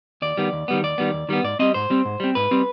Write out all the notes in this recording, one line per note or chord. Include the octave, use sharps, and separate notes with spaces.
D#2 D5
D#3 G3 B3
D#2
D#3 G3 B3
D#2 D5
D#3 G3 B3
D#2
D#3 G3 B3
G#2 D5
G3 C4 D#5
G#2 C5
G3 C4
G#2
G3 C4
G#2 B4
G3 C4